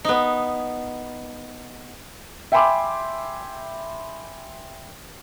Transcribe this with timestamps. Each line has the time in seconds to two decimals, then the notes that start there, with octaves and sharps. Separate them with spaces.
0.05 B3 D#4
2.52 E5 G5 G#5 B5 C6 D6